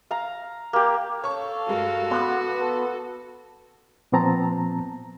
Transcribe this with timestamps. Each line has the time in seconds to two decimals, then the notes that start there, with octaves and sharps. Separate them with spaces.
0.11 F5 A#5
0.73 A#3 G4
1.24 A4 C#5 F5 A5 C#6
1.69 G2 G#3 F#4 A#4
2.11 B3 C6 D6 F#6
2.58 A4
4.12 A#2 F3 B3 C4 A5 A#5